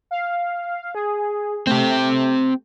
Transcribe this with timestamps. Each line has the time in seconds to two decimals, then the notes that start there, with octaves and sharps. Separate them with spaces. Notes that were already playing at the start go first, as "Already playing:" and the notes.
0.11 F5
0.95 G#4
1.67 A3 C4 G4